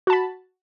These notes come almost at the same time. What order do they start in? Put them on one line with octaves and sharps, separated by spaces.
F#4 A5 B5